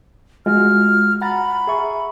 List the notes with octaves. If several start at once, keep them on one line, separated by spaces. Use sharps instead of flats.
G#3 F4 F#4 F6
F#5 A#5 B5 A6
G#4 E5 C#6